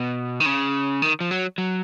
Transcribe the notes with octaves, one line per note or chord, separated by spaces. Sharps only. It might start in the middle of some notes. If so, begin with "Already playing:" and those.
Already playing: B2
D#3
C#3
D#3
F3
F#3
F#3